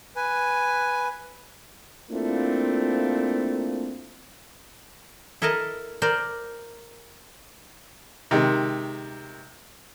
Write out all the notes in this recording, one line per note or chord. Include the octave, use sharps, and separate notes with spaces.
B4 G#5
A3 A#3 C4 D4 E4 F4
E4 A4 A#4 D#5 A5
A#4 C5 D5
C3 D#3 G#3